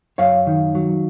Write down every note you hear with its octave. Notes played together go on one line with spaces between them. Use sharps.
F#2 C#5 F5
D#3
F#3